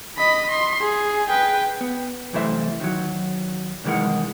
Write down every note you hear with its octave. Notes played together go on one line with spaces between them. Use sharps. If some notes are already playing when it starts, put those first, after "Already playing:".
D#5 B5
C6
G#4
B4 G5
B3
C2 F#2 E3 A3 C5 E5
D#3 E3 F#3
C2 D#3 E3 G#3 A#4 F#5